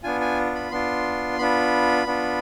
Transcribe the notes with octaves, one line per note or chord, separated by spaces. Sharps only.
B3 D4 F4 G#5
G#5
B5
B3 D4 F4 C6
B3 D4 F4 B5
B3 D4 F4